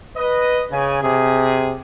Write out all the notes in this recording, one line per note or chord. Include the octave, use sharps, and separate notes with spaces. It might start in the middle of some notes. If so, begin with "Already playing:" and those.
B4 D#5
C#3 G#5
C3 G#4